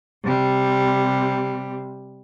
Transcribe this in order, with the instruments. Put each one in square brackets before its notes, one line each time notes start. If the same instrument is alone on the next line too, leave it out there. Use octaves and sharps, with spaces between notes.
[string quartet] C3 G3